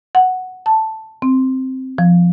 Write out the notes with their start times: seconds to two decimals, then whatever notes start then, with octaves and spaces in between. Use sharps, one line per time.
0.15 F#5
0.66 A5
1.22 C4
1.98 F3